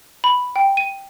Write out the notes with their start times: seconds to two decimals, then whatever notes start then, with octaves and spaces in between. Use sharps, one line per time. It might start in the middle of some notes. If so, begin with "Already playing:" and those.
0.24 B5
0.56 G5
0.77 D#7